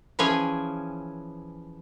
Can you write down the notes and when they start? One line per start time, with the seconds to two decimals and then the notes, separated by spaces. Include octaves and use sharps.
0.19 E3 F3 C#4 G#4 C#5 G#5